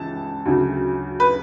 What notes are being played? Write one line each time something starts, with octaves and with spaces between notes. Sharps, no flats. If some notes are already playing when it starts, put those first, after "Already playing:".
Already playing: C#2 C#3 E3 A5
D2 C#3 F#3
B4